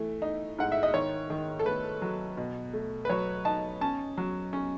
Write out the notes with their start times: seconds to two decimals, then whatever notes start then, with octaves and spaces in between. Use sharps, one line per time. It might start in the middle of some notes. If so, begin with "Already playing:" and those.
Already playing: E3 A3
0.22 D#4
0.59 G#2 F#5
0.72 E5
0.83 D#5
0.94 D#3 C#5
1.30 D#3
1.59 A4
1.66 A3 B4
2.02 F#3
2.37 B2
2.73 A3
3.05 B4
3.10 F#3 C#5
3.45 D#4 A5
3.81 C#4 A5
4.18 F#3
4.53 C#4